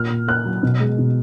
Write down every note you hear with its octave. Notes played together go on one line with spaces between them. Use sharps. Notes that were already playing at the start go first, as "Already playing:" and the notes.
Already playing: A#2 F6
A#2
A#3 F#6
F#3
B2
G#3
B2